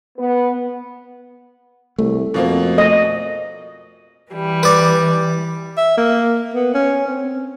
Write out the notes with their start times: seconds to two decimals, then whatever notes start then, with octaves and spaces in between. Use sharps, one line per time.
0.18 B3
1.99 C2 A3
2.34 F2 B2 A#3 C4
2.78 D#5
4.31 E3 G3
4.63 B4 D5
5.77 E5
5.97 A#3
6.54 B3
6.74 C#4
7.07 C4